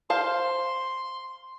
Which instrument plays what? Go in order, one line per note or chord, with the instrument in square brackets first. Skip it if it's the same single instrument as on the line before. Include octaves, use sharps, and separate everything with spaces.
[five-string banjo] C5 F5 A5 [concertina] C6